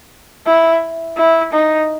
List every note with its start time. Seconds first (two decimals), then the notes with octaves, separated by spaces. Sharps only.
0.46 E4
1.17 E4
1.52 D#4